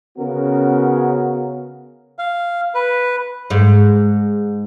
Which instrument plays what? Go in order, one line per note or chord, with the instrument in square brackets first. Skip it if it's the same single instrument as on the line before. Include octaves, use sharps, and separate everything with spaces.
[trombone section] C#3 B3 C#4 F#4 A#4
[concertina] F5
B4
[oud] G#2